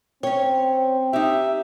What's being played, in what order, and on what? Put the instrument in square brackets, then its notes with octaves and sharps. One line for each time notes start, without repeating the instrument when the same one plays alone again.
[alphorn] C4 [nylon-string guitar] C#4 C#5 [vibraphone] G5
[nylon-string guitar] D#4 G4 [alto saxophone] E5